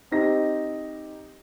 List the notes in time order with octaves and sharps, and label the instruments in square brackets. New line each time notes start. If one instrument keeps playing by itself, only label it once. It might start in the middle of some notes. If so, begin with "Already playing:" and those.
[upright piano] C4 D#4 G4 D#5 A#6